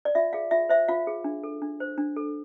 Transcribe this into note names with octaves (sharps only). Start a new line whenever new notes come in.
D5
F4 E5
G#4 F5
F4 E5
C5 E5
F4 F5
G#4
D4
A4
D4
C5
D4
A4